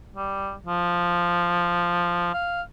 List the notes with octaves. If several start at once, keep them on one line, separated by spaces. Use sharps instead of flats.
G3
F3
F5